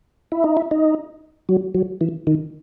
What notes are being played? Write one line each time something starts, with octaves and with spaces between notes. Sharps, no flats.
E4
D#4
E4
D#4
F#3
F#3
E3
D#3